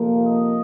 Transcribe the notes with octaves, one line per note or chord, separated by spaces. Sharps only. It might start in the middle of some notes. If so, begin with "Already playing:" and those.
Already playing: F2 C3 F3 A#3
D#5